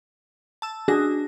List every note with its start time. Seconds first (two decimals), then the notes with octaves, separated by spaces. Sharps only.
0.62 A5 E6
0.88 D4 F#4 G#4 A#6